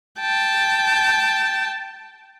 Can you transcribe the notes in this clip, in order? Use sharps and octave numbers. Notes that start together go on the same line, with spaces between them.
G5 A5